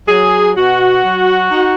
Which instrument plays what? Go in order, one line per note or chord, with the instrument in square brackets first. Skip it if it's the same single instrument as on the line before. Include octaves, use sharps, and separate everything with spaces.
[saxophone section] F#3 G#4
B2 F#4
F#3
D#4